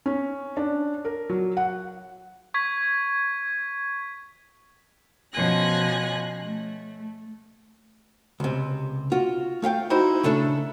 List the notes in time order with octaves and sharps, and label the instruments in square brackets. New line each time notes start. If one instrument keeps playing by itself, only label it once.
[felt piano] C#4
D4
A#4
F#3
F#5
[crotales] C#6 G#6 B6
[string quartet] B2 F3 C#4 G#5 F#6 A#6
A3
[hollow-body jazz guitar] C#2 C3
F4 F#4
A3 F4 F5 G5
D#4 E4 F#4 C5
C#3 A3 D4 A4